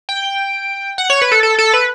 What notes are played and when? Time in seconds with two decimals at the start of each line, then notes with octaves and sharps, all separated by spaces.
0.09 G5
0.98 F#5
1.10 C#5
1.22 B4
1.32 A4
1.43 A4
1.59 A4
1.73 B4